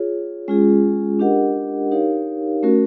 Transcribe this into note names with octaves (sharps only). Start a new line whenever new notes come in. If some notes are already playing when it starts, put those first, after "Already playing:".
Already playing: F4 G#4 C#5
G#3 C#4 F4 G#4
D4 G4 A#4 D#5 F#5
D#4 G4 A#4 C#5 F5
A3 C#4 F#4 A#4